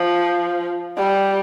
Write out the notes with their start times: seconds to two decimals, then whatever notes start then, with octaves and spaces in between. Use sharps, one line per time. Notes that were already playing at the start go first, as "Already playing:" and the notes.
Already playing: F3
0.98 G3